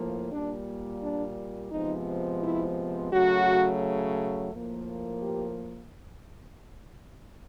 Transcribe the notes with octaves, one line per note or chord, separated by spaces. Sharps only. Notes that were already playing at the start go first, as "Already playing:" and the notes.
Already playing: A2 F3 A#3
A#2 G3 A#3 D4
D4
C3 F3 G#3 B3 D#4
E4
C#3 F#3 A3 F#4
A2 F3 A#3
G4